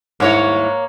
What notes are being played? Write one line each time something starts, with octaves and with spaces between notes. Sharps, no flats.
D#2 G#2 G3 A#3 E4 C#5